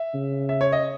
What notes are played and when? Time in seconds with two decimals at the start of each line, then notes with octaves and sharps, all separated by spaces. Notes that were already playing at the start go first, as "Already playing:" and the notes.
Already playing: E5
0.14 C#3
0.49 E5
0.61 C#5
0.72 D#5